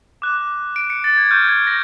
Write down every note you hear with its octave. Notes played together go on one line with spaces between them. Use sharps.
D6 F#6
D7
C#7
A6
G#6
C#6 F6 G6
G#6
A#6